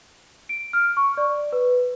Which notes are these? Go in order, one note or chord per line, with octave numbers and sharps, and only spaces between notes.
D7
F6
C#6
D5
B4